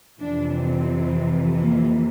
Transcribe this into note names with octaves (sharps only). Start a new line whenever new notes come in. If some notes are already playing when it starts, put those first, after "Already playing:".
F2 C3 E3 D4
C4
A#3